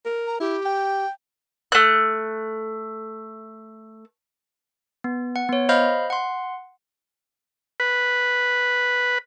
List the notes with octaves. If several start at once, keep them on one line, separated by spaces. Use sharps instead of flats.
A#4
A#5
E4 G4
G5
A3 F#6
B3
F#5
B3 C#5
C5 D#5 F5 B5 F6 G6
F#5 C6
B4